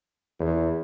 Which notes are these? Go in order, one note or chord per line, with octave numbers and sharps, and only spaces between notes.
E2